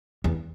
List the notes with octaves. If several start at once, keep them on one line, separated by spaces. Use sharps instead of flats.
E2